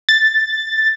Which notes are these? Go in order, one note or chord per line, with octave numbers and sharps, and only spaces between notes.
A6